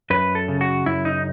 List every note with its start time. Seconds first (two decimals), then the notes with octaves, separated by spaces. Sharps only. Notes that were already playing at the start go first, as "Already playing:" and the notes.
0.10 F#2 B4
0.35 A4
0.48 C#3
0.61 F#4
0.86 F#2 E4
1.05 D#4